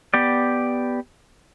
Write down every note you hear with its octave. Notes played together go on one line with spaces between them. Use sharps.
B3 G4 D5